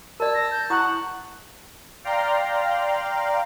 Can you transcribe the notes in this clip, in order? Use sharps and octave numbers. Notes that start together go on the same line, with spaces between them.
A#4 D5 A5 E6
A#6
G6
E4 F#5 C#6 D#6
D5 F5 G5 A#5 C6 F6